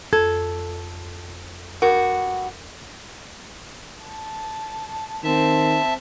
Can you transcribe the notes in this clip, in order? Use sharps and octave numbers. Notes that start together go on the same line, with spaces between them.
F2 A4
G2 F#4 A#4
A5
D#3 C4 E5 A5